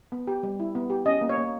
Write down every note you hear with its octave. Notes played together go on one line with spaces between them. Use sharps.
B3
G4
G3
E4
B3
G4
C#4 D#5
A#3
C#5
A#3